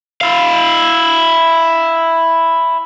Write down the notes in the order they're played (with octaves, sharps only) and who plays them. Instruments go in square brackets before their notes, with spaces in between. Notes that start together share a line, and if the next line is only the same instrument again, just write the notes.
[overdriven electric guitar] E4 F5